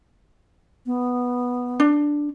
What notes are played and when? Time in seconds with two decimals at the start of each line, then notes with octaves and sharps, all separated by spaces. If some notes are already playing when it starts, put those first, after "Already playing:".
0.86 B3
1.80 D4